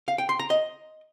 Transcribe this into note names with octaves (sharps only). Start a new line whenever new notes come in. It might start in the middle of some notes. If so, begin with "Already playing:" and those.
F5
G5
C6
A#5
D#5